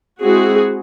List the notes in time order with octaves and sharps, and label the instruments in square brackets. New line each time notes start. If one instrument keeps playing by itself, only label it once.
[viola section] G#3 C4 E4 F#4 G#4